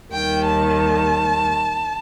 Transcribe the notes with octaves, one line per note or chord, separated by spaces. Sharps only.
D#2 D#3 G3 G5
A5